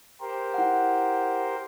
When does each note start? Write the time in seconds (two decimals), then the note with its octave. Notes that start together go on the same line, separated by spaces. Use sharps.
0.21 G4 A#4 C5
0.54 E4 F#5